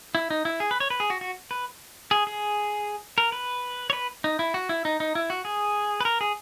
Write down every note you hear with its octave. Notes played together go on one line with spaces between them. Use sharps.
E4
D#4
E4
G#4
B4
C#5
B4
G#4
F#4
F#4
B4
G#4
G#4
A#4
B4
C#5
B4
D#4
E4
F#4
E4
D#4
D#4
E4
F#4
G#4
B4
A#4
G#4